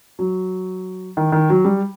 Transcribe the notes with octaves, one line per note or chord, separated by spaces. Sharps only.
F#3
D#3
D#3
F#3
G3